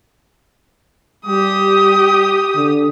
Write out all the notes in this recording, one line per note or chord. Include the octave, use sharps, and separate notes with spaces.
G3 G4 D#6
D3